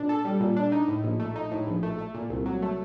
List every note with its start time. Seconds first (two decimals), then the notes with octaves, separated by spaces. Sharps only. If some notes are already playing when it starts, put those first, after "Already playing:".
Already playing: A#2 D4
0.09 A4
0.25 G3
0.40 A#2
0.56 D4
0.72 D#4
0.88 A2
1.04 A#1
1.20 A3
1.36 D#4
1.51 A2
1.67 A#1
1.83 A3
1.98 A3
2.15 A#2
2.30 C2
2.46 F#3
2.62 A3